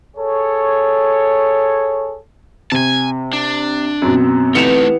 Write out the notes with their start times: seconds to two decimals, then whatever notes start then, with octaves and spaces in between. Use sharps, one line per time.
0.17 G#4 A4 C#5
2.72 C3 G#5 A5
3.33 D4
4.02 F#2 B2 C4
4.55 E3 A3 B3 D#4 G4 C#7 E7 F7